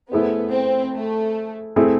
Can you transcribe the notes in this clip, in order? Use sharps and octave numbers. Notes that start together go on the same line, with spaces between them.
A3 B3 E4 G#4 C5
C4
A3
A3 C4 E4 G#4